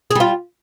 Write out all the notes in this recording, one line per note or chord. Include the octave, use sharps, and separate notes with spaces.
G3 F4 G#4